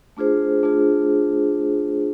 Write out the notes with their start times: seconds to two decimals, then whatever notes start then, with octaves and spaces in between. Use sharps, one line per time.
0.17 A3 D4 F4 G#4 C5
0.63 A3 D4 F4 G#4 C5